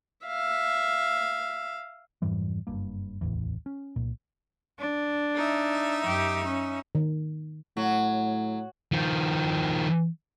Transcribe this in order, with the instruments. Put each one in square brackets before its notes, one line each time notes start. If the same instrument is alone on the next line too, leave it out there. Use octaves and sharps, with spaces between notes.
[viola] E5 F5
[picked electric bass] F2 G#2 E3 G3
F#1 G2 A#3
D1 A1 E2
C#4
C2 A#2
[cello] D4
[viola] D#4 E5
[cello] F#2 G4
C#4
[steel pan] D#3
[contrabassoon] A2 [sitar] F#3
[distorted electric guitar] D#3 F3